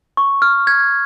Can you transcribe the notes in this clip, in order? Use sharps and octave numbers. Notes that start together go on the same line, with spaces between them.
C#6
F6
G#6